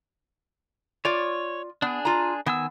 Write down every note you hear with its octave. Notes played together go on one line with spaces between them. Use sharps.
F4 C#5 D5
B3 D4 G#4
F4 A#5
D#3 B3 G#5 E6